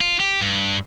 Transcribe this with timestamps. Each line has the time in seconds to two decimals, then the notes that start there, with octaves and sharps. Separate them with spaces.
0.01 F4
0.20 G4
0.41 G2